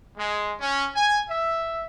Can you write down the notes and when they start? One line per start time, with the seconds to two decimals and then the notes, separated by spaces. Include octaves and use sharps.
0.17 G#3
0.60 C#4
0.95 G#5
1.30 E5